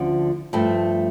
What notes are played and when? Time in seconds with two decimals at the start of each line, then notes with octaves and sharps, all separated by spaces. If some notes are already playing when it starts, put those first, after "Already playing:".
Already playing: D2 D3 F3 C#4
0.53 G2 F3 A3